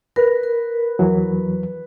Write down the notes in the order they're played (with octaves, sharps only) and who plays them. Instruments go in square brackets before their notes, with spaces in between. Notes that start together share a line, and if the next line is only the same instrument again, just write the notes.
[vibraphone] A#4 [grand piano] B4
[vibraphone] A#4
[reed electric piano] E2 E3 F#3